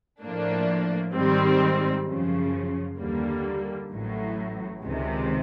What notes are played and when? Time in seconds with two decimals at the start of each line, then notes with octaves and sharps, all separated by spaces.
0.22 A2 F3 A#3 D4
1.14 G#2 D#3 G3 C4
2.06 F#2 C#3 F3
2.98 D#2 D3 G3 A#3
3.89 A1 A2 F#3
4.81 C#2 C3 D#3 G#3